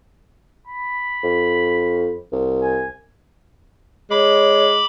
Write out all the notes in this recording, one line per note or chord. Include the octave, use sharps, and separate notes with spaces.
B5
F2
C2
G#5
G#3 C#5 B5 D6